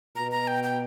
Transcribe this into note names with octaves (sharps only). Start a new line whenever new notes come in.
B2 A#5
A#5
G5
G5